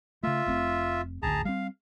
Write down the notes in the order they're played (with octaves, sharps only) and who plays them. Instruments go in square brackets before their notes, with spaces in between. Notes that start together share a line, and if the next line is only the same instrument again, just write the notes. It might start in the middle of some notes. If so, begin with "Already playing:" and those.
[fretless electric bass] C#3 A3 [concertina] F4 E5
[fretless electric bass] F1 A3 C4
[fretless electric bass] D1 A1 D2 [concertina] G#4 A5 A#5
[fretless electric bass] G3 C4 [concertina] F5